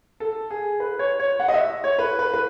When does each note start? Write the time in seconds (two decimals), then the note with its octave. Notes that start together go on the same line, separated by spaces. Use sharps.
0.20 A4
0.50 G#4
0.80 B4
0.99 C#5
1.20 C#5
1.40 F#5
1.48 D#5
1.54 E5
1.84 C#5
1.99 B4
2.19 B4
2.34 B4